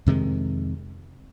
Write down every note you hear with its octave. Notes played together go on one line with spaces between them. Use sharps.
F2 C3 D#3 G#3